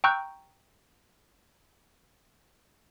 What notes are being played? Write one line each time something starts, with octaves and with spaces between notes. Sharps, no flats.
G5 A#5 C#6 E6 F#6 G6